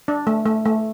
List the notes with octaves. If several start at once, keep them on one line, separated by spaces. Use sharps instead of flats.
D4
A3
A3
A3